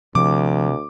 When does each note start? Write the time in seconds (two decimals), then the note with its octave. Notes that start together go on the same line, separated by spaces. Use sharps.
0.15 D2 C3 F3 D6